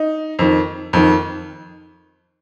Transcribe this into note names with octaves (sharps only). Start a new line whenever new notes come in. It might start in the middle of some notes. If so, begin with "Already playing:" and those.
Already playing: D#4
F2 D#3
F2 D#3